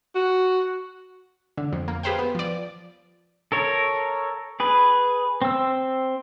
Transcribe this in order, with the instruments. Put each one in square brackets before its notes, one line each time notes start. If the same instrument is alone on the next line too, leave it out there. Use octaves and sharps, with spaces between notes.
[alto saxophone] F#4
[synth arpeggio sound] D3
F2
A#3
G4 G#4 B4 C5 F5 G5
B3
F3 D5
[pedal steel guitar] A4 A#4 C#5
G#4 B4
C4 E6